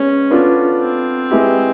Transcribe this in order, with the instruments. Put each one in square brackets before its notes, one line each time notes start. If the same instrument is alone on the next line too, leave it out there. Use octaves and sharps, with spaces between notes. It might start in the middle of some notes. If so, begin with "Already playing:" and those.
Already playing: [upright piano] G#3 B3 [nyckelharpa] C#4
[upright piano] B3 D4 F4 A4
[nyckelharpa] C4
[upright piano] G#3 B3 E4 G4